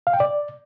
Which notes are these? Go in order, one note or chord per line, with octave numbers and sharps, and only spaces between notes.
F5
G5
D5